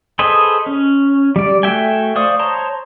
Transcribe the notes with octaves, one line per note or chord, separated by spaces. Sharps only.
G#4 A4 B4 C5 D#5
C#4
G3 D5
A3 F#4 E5 G5 G#5
C5 D5 F5 C#6 D#6
C5 C#5 A5 A#5 C6